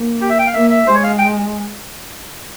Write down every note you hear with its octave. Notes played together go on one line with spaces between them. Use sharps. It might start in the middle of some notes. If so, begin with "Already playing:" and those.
Already playing: A#3
G4
E5
G5
F5
A#3 E5
E5
G#3 C5
C#5
F5
G5